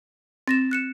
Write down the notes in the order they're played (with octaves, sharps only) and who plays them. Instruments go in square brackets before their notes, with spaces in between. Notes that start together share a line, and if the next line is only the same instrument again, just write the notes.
[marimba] C4 [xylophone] A6 A#6 E7
[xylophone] F#6 C#7 E7